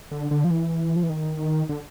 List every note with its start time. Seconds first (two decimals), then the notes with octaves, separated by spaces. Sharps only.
0.12 D3
0.31 D3
0.44 F3
0.51 E3
0.96 F3
1.03 E3
1.10 D#3
1.69 D3